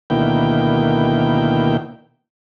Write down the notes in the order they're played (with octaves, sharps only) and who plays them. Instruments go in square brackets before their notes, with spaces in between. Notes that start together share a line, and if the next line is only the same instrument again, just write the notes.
[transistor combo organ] D2 B2 D#3 A#3 E4 G5